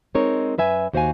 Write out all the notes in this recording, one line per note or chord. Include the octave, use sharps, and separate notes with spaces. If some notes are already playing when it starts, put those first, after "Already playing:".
G#3 C4 D#4 A#4 C#5
F#2 B4 E5 G#5
D#2 F#4 C5 C#5 F5 G#5